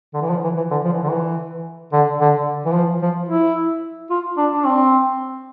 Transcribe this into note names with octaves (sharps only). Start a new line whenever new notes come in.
D3
E3
F3
E3
E3
D3
F3
E3
D3
E3
D3
D3
E3
F3
F3
E4
F4
D4
D4
C4